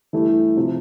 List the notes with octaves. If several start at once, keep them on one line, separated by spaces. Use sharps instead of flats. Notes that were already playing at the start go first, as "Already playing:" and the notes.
G2 E3 A3 E4 G4
C3 F3